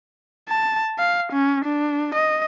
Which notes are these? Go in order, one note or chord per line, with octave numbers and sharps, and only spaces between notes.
A5
F5
C#4
D4
D#5